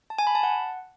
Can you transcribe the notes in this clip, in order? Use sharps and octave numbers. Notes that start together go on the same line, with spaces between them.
A5
G#5
B5
A5
F#5